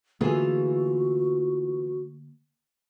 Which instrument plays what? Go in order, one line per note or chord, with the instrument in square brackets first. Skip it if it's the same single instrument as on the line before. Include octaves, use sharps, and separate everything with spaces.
[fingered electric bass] D3 A3 A#3 [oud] E3 F4 G#4 [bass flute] F#4